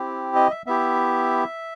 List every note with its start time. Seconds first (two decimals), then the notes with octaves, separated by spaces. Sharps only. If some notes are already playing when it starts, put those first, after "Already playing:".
Already playing: C4 E4 G4
0.35 D#5
0.51 E5
0.66 B3 E4 G4 E5